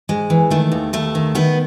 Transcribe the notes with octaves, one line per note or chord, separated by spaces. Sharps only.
G#2 G#3
E3
D#3 A3
D#2
D#2 A3
D#3
D#3 B3